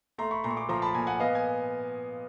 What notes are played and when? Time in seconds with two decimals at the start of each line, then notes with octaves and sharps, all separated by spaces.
0.18 A3 A#5 C6
0.31 B5 C#6
0.44 A#2 A#5 C6
0.51 C#6
0.57 C6 D6
0.69 F3 A#5 C6
0.82 A5 B5
0.94 A#2 G#5 A#5
1.07 F#5 G#5
1.20 B3 D#5 F5
1.35 G#5